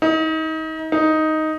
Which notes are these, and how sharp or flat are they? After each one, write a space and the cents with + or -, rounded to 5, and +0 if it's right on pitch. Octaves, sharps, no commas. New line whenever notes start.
D#4 +30
D#4 +5